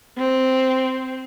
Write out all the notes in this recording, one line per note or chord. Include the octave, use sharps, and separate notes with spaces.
C4